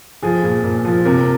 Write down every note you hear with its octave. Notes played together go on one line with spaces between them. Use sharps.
F3 G#4
A#2
A#2
F3
C3 A#4